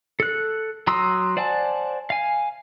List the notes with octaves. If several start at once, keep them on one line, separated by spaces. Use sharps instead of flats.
A4 F#6
F#3 A#5 C6 D#6 E6
C5 D5 F#5 G#5 A5
F5 G#5